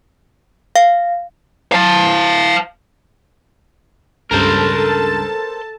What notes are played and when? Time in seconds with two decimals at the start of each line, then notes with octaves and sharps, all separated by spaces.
0.76 F5
1.72 F5 A5
4.31 C#2 G2 C#3 A4 A#4 C5 A5